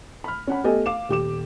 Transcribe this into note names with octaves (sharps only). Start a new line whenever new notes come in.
B5 F6
C#4 F#5 B5
A3 B3 G4 A4 D#5 G#5
F5 D6 E7
D#1 G4 D6 E7